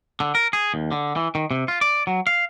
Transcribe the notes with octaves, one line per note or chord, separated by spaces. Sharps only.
D3
A#4
G#4
D#2
D3
E3
D#3
C3
F4
D5
F#3
F5